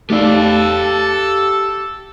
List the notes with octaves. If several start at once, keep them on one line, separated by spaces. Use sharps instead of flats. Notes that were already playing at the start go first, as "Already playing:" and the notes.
A3 D#4 G4 A4 D5 F5